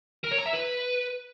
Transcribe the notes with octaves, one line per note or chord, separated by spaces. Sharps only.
A#4
C#5
A#5
E5
B4